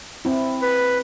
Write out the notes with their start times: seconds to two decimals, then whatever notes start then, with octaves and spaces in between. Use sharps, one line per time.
0.25 C4 E4
0.62 B4